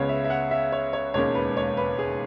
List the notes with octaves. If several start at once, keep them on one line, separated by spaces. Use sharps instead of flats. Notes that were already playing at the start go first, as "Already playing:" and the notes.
Already playing: C#2 C#3 G#3 B3 C#5
E5
E5
F#5
E5
C#5
C#5
E1 D#2 D#3 G#3 C#4 C#5
B4
C#5
B4
G#4